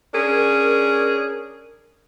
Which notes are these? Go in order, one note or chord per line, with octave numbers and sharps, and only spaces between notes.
C#4 D4 G#4 A#4